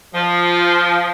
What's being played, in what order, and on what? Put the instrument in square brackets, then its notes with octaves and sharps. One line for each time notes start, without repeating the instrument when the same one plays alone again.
[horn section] F3